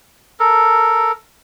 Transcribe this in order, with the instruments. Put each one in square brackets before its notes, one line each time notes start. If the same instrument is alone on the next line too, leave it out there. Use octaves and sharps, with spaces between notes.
[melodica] A4 A#4